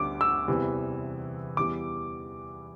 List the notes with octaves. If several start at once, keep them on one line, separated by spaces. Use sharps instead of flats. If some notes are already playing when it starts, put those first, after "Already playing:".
Already playing: D2 D3 G3 D6
E6
E2 C3 E3 G3
E2 E3 G3 D6